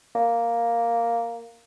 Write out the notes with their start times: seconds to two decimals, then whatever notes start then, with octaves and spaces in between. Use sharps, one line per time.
0.15 A#3